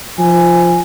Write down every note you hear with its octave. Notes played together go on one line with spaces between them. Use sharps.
F3 G#5